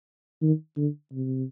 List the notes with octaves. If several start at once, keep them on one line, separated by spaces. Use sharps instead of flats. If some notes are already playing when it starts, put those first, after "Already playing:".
D#3
D3
C3